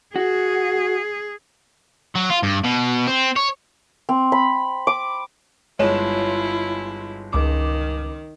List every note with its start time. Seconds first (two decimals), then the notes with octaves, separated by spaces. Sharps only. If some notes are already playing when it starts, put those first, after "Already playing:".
0.16 F#4 G#4
2.16 F#3
2.30 F4
2.43 G2
2.64 B2
3.07 C4
3.36 C#5
4.09 C4
4.32 B5
4.87 D6
5.79 G1 G#3 E4 F4 C#5 E7
7.33 C#2 D#3 D6